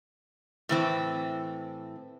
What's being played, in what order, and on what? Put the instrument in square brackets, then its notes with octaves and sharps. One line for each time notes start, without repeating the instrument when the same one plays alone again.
[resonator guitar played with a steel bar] A2 E3 C4